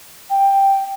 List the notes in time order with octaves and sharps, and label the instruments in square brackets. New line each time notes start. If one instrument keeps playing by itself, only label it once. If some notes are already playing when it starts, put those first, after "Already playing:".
[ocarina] G5